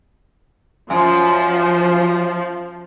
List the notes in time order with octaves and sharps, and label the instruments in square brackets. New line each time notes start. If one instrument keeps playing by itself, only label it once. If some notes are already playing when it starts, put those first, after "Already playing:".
[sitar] F#2 [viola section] F3